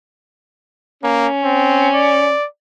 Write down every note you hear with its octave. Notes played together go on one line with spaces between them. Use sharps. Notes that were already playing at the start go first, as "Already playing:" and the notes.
A#3 C#4
C4
D5